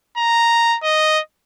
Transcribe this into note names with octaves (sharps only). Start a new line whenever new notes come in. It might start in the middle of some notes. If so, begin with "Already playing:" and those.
A#5
D#5